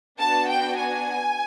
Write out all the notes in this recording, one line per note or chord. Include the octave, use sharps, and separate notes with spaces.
B3 D4 F#4 A5
G5
G#5